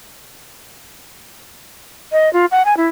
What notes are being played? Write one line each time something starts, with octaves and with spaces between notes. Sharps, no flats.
D#5
F4
F#5
G#5
E4